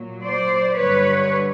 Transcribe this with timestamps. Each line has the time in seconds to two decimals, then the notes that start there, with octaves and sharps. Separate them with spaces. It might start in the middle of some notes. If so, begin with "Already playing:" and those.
Already playing: A#2 F#3
0.23 C5 D5
0.76 G2 D3 G3 B4 C#5